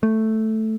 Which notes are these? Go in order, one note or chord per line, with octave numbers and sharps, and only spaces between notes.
A3